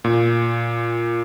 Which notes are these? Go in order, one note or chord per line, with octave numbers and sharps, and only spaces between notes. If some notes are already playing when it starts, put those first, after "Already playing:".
A#2